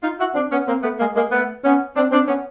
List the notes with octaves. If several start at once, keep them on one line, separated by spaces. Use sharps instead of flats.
D#4 F4
E4 F#4
C4 D4
B3 C#4
A#3 C4
A3 B3
G#3 A#3
G#3 A#3
A3 B3
B3 C#4
C4 D4
C4 D4
B3 C#4